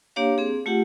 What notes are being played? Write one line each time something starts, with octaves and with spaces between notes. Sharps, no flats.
A#3 D4 G4 C#5 F5
C4 G#4
A3 F4 G4 F#5